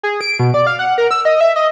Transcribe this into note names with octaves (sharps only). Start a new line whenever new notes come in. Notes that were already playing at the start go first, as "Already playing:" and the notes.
G#4
D7
B2
D5
F5
F#5
A#4
E6
D#5
E5
D#5